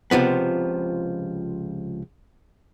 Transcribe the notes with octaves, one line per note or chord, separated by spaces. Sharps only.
C#2 C3 F3 B3